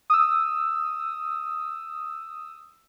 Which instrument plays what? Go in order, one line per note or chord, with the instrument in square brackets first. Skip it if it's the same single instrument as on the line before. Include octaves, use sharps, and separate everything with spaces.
[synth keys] D#6 E6